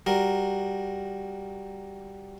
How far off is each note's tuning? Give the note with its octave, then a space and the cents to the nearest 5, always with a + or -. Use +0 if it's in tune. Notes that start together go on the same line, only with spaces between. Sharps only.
G3 +0 F#4 +0 A#4 +0